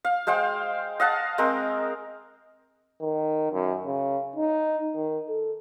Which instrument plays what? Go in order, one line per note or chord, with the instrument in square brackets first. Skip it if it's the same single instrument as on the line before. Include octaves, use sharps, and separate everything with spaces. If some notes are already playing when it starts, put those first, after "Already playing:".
[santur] F5
G#3 C5 F5 G5
D#5 F5 F#5 A5
G#3 C4 A#4
[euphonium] D#3
F#2
C#3
D#4
D#3
A4